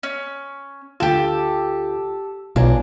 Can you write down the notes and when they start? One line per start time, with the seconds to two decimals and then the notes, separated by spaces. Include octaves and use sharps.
0.03 C#4
1.00 D2 F4 G4 A4
2.56 B1 D4 F4 G#5 A#5